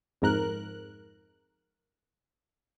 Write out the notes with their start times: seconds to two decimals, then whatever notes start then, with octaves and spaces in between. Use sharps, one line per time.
0.22 F2 G#2 A#4 F#6